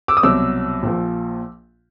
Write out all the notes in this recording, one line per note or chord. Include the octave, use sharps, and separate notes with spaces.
D6 E6
D#6
C2 B2 F#3 D6 E6
A#1 A#2 F3